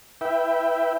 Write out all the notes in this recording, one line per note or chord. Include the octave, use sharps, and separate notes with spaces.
E4 B4 E5 G5